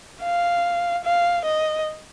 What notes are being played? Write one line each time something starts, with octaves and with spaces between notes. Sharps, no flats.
F5
F5
D#5